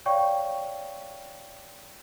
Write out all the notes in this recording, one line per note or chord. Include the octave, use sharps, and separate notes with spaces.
C#5 D5 F5 G5 C#6